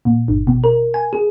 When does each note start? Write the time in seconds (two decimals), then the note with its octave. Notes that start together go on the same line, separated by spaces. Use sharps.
0.05 A#2
0.28 G1
0.47 B2
0.64 A#4
0.94 G#5
1.13 G#4